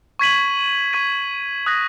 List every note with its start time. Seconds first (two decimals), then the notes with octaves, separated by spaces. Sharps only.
0.19 C#6 G#6 B6 D#7 F#7
0.93 C#6 G#6 B6 D#7
1.66 D#6 F#6 A#6